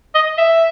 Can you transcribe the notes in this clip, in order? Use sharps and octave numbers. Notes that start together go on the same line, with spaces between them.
D#5
E5